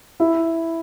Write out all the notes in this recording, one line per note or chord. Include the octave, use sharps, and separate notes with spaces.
E4